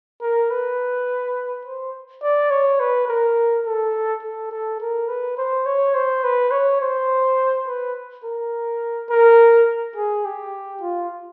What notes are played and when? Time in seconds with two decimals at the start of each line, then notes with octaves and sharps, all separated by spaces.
0.22 A#4
0.51 B4
1.66 C5
2.23 D5
2.51 C#5
2.80 B4
3.08 A#4
3.66 A4
4.23 A4
4.52 A4
4.81 A#4
5.09 B4
5.38 C5
5.66 C#5
5.95 C5
6.24 B4
6.52 C#5
6.81 C5
7.67 B4
8.24 A#4
9.10 A#4
9.96 G#4
10.25 G4
10.82 F4